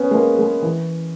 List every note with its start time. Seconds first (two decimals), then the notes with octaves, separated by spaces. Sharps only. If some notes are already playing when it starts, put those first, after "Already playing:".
Already playing: B3 C#4
0.11 G#3
0.14 A#3
0.39 G#3
0.62 E3